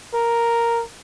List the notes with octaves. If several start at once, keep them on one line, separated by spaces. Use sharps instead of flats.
A#4